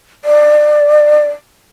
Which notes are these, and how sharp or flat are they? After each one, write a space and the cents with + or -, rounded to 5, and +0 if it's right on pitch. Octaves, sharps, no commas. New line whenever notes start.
D5 +25